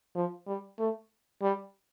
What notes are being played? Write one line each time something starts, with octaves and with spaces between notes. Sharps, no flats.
F3
G3
A3
G3